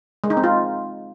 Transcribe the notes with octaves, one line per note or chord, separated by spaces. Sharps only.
G#3
D#4
C4
F4